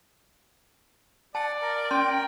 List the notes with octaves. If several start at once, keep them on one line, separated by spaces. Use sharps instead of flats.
D5 F#5 A5
A#4
C#4 G5 C6